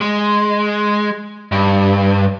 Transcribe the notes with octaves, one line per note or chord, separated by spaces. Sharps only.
G#3
G2